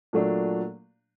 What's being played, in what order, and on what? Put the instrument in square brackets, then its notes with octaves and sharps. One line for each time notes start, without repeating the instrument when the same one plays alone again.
[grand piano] A#2 F#3 A3 D4